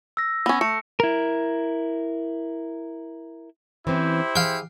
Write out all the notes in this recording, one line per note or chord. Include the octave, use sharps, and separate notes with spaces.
E6 A#6
B3 C#4
A3 C#7
E4 A#4
E3 C4 C#4 E4 G4 C5
G#4 F5 G5